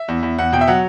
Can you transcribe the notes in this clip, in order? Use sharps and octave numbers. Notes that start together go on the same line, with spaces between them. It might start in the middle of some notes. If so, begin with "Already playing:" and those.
Already playing: E5
E2
E2
E2 F#5
B2 G5
E5
F#3 F#5